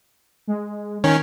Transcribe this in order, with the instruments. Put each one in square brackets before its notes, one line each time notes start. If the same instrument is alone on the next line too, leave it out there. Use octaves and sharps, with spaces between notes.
[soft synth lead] G#3
[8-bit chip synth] D#3 C#4